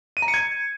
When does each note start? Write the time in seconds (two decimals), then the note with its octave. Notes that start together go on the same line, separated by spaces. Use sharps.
0.17 D#7
0.22 A#5
0.28 C#7
0.34 G#6